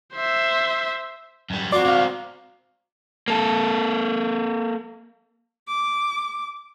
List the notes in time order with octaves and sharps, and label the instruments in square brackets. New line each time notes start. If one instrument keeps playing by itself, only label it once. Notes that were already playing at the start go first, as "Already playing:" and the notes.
[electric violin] C5 E5
[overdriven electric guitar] F#2 G3
[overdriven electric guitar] C4 F4 [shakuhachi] F#4 [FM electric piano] D5
[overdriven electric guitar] C4 A#4 [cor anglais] F5
[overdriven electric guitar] A#3 A4
[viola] D6